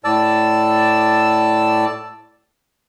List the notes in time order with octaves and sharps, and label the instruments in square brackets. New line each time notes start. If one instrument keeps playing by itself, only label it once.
[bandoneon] A2 D5 A5 E6